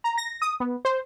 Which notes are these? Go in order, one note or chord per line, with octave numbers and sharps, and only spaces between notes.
A#5
A#6
D#6
B3
C5